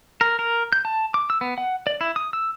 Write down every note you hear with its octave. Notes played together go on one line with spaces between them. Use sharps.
A#4
A#4
G6
A5
D6
E6
B3
F#5
D5
E4
D#6
E6